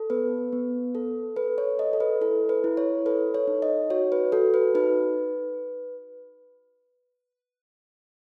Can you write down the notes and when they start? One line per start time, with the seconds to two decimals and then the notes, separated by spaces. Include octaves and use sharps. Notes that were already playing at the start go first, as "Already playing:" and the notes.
Already playing: A4
0.10 B3 B4
0.53 B3
0.95 A4
1.36 A4 B4
1.58 C#5
1.79 A4 D#5
1.93 A4
2.00 B4
2.21 E4 A4
2.49 B4
2.64 E4
2.77 C#5
3.06 A4 B4
3.34 C#5
3.47 D#4
3.62 D#5
3.90 F#4 C#5
4.12 B4
4.32 F#4 A4
4.54 B4
4.75 D#4 B4